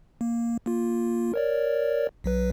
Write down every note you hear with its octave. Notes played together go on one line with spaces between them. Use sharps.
A#3
A#3 F4
A#4 C#5 D5
B1 F#3 B4